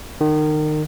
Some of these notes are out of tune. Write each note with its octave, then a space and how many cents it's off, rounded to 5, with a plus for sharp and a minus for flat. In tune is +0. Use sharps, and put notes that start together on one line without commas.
D#3 -30